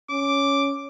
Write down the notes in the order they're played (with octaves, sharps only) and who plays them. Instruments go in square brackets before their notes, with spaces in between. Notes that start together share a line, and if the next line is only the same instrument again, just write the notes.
[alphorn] C#4 [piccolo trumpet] D6